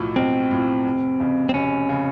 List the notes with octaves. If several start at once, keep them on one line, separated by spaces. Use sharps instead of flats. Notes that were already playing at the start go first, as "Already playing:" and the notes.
Already playing: B1 A2 F3
B1 C4
A2 F3
F1
F2 C#3
C4
F1 C#4
C#3